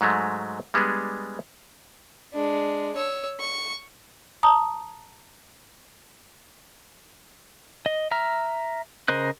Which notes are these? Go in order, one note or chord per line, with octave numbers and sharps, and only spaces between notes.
G#2 F#3 G#3 A3
G3 G#3 B3 D4 G#4
G#3 D4
C#5 E6
C#6
A5 A#5 D#6
D#5
E5 A#5 F6
C#3 A#4 C5 D#5 F#6